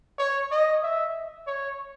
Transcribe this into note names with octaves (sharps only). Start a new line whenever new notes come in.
C#5
D#5
E5
C#5